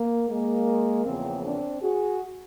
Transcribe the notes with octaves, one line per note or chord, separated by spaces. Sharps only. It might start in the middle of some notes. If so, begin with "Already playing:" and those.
Already playing: A#3
G#3 A#3
E2 C#3 F3 A#3 C4
C4 D4
F#4 G#4